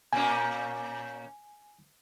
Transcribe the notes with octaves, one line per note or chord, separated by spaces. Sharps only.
A#2 A#3 C#4 G#5